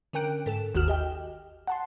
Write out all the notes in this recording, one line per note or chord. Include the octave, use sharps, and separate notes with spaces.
D3 C#4 A#4 G5 F#6 D7
G#2 A4 E7
G1 D#2 D#3 F#4 F6 E7
G4 D#5 G5
F#5 A5 C6